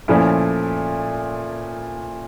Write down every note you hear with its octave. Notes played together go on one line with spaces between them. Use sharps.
A#2 F3 A3 C#4 E4